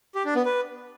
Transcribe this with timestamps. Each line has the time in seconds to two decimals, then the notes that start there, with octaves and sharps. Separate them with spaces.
0.15 G4
0.25 D4
0.35 B3
0.45 B4